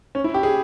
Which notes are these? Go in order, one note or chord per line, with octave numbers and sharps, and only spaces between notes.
C#4
E4
G4
G#4